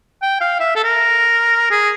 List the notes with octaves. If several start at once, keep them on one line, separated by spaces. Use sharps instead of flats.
G5
F5
E5
A4
A#4
G#4